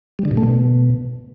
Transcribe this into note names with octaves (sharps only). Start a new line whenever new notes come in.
G3
D3
A#2
A3
B2